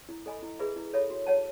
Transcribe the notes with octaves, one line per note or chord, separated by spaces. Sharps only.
E4
A4 D#5 G#5 B5
E4
G#4 B4 E5 B5
E4
A4 C#5 E5 B5
F#4
C#5 F#5 A5